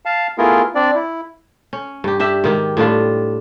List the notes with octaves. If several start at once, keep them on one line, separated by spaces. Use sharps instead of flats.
F5 A5
A3 B3 E4 F4 G#4 A#4
C4 D4 D5
E4
C#4
G2 G4
D4 G4 E5
G#2 D#3 G4
A2 G3 D4 F4